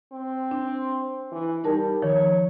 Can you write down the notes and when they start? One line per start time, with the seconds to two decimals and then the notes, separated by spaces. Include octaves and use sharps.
0.13 C4
0.51 D4
1.32 E3
1.64 G3 D#4 A#4 A5
2.02 D#3 F3 C#5